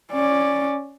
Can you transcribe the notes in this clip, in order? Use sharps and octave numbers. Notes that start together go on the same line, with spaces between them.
C#4 D5